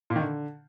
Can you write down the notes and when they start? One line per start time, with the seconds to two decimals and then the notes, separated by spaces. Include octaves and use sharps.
0.10 A#2
0.16 D#3
0.21 D3